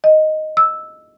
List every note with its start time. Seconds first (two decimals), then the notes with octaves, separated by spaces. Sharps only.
0.04 D#5
0.57 E6